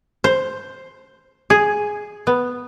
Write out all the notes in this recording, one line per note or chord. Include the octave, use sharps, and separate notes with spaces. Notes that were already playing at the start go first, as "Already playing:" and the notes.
C5
G#4
B3